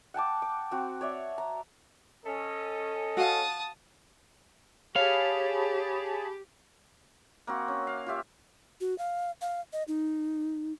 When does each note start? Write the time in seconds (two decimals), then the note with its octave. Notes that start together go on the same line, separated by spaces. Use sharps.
0.14 F#5 G5 A5 D6
0.42 D6
0.71 C4 F#4
1.01 C#5 D5 E5
1.38 A#5
2.26 C#4 A4 D#5
3.17 F#4 F5 A5 D#6
4.96 G4 G#4 C#5 F5 A5 B5
7.47 A#3 C4 F#4
7.68 C#4
7.87 F5
8.06 F4 G4 E5
8.81 F#4
8.98 F5
9.41 F5
9.73 D#5
9.88 D#4